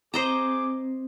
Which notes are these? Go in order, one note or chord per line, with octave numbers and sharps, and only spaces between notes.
C4 G#4 C5 D#5 A#5 D6